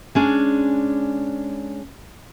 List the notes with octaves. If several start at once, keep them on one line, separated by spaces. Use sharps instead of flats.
G#3 C#4 D4